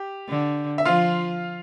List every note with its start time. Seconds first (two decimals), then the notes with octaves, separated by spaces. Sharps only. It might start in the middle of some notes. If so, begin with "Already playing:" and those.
Already playing: G4
0.28 D3
0.78 E5
0.85 F3 F4 F5